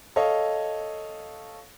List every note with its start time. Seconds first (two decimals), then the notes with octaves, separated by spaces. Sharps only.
0.16 A4 C#5 D#5 F5